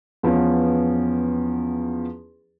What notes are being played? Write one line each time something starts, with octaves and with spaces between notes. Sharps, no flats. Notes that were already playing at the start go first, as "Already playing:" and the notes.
E2 F3 B3 C#4